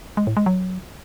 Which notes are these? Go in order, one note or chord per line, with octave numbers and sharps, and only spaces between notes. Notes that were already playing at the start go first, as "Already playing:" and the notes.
G#3
A2
G#3
F#3